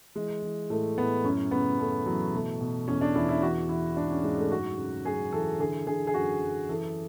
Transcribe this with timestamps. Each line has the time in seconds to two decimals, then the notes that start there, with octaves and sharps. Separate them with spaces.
0.16 E3 G#3
0.42 E3
0.70 A2 A3
0.98 A2 B3
1.24 F#2 C#4
1.51 C#3 B3
1.79 F#2 A3
2.06 E3 F#3
2.34 B2 A3
2.61 B2
2.88 E2 C#4
3.01 D4
3.15 E2 E4
3.29 E4
3.42 E3 F#4
3.69 E3 E4
3.97 G#2 D4
4.11 C#4
4.24 G#2 G#3
4.38 A3
4.51 F#2 F#4
4.79 C#3
5.05 F#2 G#4
5.33 E3 A4
5.59 D3 G#4
5.87 D3 G#4
6.07 G#4
6.14 F#2 F#4
6.42 F#2
6.69 E3 A4